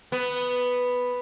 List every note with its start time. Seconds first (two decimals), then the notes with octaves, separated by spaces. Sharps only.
0.12 B3